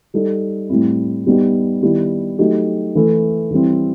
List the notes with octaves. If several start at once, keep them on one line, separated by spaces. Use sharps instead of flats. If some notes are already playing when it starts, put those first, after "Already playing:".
G3 D#4 A4
A2 G3 C4 E4
G3 B3 D#4 G4
D#3 G3 B3 E4 G4
F#3 A3 D#4 G4
E3 A3 E4 A4
E3 G3 C4 E4